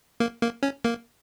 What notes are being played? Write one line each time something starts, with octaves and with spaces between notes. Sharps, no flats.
A#3
A#3
C#4
A#3